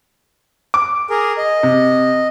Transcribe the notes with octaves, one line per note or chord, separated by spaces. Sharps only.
D6
G#4 A#4
D#5
C3